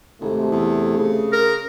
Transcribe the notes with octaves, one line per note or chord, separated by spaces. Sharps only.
G#1 C3 A3
E2
C#3
A#4